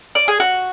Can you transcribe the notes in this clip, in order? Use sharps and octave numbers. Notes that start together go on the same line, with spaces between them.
D5
G#4
F#4